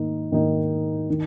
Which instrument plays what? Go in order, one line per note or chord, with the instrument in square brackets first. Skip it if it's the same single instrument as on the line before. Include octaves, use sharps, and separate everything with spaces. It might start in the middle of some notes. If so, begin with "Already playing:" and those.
Already playing: [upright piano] G#2 D#3 A#3 D#4
G#2 D#3 A#3 D#4
D#3